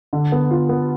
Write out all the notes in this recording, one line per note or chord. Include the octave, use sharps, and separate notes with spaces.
D3
B3
F4
B3